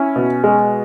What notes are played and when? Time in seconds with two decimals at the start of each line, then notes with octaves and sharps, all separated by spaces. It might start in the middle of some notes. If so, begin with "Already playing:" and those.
Already playing: C#4 E4
0.16 B2
0.44 G#3